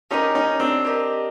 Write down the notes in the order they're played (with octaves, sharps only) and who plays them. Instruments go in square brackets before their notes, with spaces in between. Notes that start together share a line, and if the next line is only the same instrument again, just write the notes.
[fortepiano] C#4 D#4 [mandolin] G4 A#4 D#5
[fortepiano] C#4 D#4
C4 D4
[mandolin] G4 A#4 D#5